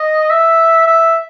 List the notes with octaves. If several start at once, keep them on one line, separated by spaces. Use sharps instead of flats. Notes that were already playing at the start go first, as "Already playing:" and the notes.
Already playing: D#5
E5
E5